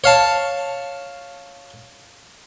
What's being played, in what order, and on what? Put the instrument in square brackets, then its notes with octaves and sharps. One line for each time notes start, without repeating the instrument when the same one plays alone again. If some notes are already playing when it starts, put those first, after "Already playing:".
[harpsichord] C#5 F5 A5